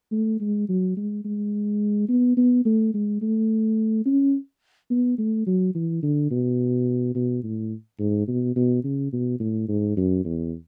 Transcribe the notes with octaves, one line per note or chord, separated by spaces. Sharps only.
A3
G#3
F#3
G#3
G#3
B3
B3
A3
G#3
A3
C#4
B3
A3
F#3
E3
D3
B2
B2
A2
G#2
B2
B2
C#3
B2
A2
G#2
F#2
E2